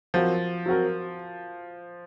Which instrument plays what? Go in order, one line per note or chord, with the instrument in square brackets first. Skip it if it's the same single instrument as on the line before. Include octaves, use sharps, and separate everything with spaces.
[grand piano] F3 [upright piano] F#3 C4 F#4 A#4
[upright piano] F#3 C4 F#4 A#4